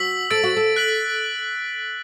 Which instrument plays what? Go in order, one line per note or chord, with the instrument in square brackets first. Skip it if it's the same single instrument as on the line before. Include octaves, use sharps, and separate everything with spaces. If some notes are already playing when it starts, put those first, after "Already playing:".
Already playing: [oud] F#4 [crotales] E6 B6 F#7
[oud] A4 [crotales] E6 A6 D7
[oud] F#4
A4
[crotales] F#6 B6 F#7